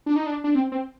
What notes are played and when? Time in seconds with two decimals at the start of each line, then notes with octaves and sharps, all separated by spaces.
0.06 D4
0.16 D#4
0.26 D4
0.44 D4
0.55 C4
0.72 C4